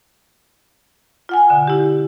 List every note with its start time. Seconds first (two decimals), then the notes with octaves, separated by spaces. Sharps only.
1.29 F4 F#5 G#5
1.50 B2 D3
1.68 E4 G4